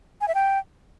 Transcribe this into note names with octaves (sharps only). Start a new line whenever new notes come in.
G#5
E5
G5